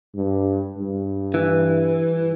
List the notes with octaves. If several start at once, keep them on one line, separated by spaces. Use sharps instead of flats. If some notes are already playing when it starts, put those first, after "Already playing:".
G2
G2
E3